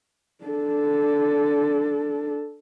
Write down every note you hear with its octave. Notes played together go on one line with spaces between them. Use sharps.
D4 A4